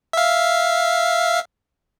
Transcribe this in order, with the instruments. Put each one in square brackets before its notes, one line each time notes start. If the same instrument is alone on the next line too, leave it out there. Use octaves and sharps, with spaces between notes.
[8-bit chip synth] E5 F5